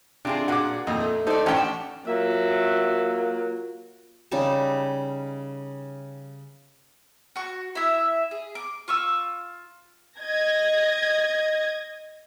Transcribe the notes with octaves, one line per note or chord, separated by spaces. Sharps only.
C3 D4 F4 G#4
A#2 F#4 G#4 F#5 D6
F2 A#2 D#4
A3
A3 D#4 A4 C5 D5
A1 C#4 D4 F#5 G5 A5
F#3 A#3 F4 E5
C#3 G3 D#4 A5
F#4 C#6
E4 E5
G#4
D6
F4 C#6 E6
D#5 G#6 A#6